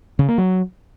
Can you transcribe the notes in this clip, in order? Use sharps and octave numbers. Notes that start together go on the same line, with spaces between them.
C#3
A#3
F#3